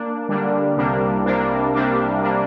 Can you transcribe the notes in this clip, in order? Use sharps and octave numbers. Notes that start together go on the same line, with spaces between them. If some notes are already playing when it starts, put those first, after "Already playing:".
Already playing: A#3 D4
D3 G3 A#3 D4
C2 C3 G3 A#3 D4
C2 C3 G3 A#3 D4
C2 C3 G3 A#3 D4
C3 G3 A#3 D4